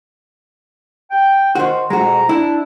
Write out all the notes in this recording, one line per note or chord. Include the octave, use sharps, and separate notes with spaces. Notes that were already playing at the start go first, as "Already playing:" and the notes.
G5
D#3 F#4 C5
F2 B2 G#3 F#4 A#5
D4 E4